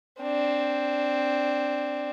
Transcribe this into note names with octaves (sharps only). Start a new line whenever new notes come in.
C4 D4